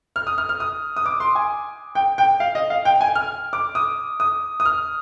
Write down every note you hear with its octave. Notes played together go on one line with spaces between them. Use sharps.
F6
D#6
F6
F6
D#6
D#6
D6
C6
G#5
G5
G5
F5
D#5
F5
G5
G#5
F6
D6
D#6
D#6
D#6
F6